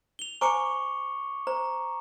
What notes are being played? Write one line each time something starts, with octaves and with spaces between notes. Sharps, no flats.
F7 G7
C5 G#5 A#5 C#6 D6 C#7
C5 A#5